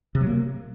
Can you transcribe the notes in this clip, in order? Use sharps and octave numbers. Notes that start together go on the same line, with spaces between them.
C3
F#3
A#3